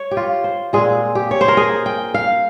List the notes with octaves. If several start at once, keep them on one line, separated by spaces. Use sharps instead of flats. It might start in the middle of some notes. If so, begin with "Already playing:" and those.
Already playing: C#5
G4
F4
C5
A#2 G#3 C4 G#4
G4
C#5
C5
A#4
G#4
G5
F5